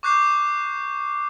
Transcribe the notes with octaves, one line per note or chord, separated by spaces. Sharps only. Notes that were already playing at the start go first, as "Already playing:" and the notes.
C#6 D6 F#6 G6 C7